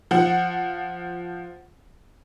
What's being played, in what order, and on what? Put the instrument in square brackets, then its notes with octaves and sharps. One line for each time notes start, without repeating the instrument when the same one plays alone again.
[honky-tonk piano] F3 F#5